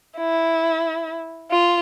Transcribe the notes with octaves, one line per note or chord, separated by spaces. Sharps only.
E4
F4